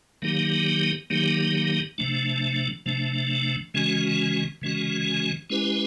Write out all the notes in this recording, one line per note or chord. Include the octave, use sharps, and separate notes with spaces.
D#3 F#3 A#3 D#4 G4
D#3 F#3 A#3 D#4 G4
C3 F3 A3 D4
C3 F3 A3 D4
C#3 E3 G#3 C#4 F#4
C#3 E3 G#3 C#4 F#4
G#3 C#4 E4 G4 B4